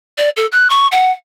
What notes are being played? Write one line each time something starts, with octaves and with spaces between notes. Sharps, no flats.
D5
A4
F#6
C#6
F#5